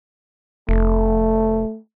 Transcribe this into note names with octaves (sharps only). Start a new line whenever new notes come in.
F1 A3